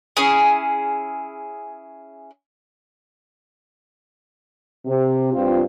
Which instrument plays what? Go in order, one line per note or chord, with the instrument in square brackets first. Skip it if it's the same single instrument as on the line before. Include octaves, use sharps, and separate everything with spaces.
[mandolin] C#4 E4 G#4
[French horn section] C3
G2 C4 F4